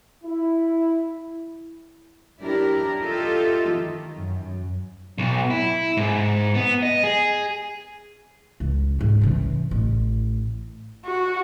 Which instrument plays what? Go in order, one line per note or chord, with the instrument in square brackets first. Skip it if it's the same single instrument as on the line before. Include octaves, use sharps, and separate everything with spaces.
[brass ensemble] E4
[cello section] F#3 D4 E4 G4 A#4
F4 G4 A4 D#5 E5
D#3
F#2
[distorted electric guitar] B1
E4
G#2
B3
D#5
G#4
[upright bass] C#2
G#2 G3
C#3 E3
A1
[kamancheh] F#4